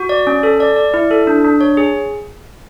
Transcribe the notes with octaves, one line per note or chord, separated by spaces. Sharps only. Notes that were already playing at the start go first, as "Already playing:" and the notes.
Already playing: F#4
D5
C#4
A4
D5
D5
E4
A4
D4
D4
C#5
G#4